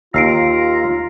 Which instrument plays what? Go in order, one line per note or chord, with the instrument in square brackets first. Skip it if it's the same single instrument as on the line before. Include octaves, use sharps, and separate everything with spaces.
[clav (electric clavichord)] D#2 F5 [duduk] F4 [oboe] A#5 [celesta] E6 C7 D7